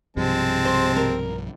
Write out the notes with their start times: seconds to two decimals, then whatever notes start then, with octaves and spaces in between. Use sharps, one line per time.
0.17 B1 G2 C3 F3 G#3 C4 A5
0.65 C5
0.96 A#4